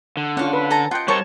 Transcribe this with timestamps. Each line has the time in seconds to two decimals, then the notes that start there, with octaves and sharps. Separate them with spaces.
0.17 D3
0.37 C#4 F4 F5 F#5
0.53 B4
0.70 A4 G#5 A#5
0.91 F4 D#5 F#5 G5
1.08 G3 D#4 A#4 C5 C#5 A5 C#6